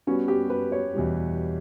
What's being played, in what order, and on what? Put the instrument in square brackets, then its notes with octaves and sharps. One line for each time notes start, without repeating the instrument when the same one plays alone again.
[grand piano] G3 B3 F#4 [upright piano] C#4
[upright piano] G4
B4
C#5
[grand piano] E2 B2 G3